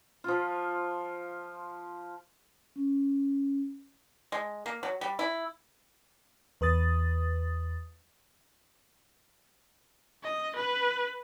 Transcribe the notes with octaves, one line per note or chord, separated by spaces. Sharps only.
F3 F4
C#4
G#3
A#3
F#3
G3
E4
E2 B4 D#6 A6
D#5
B4